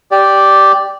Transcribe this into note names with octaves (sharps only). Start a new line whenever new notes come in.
G4 D5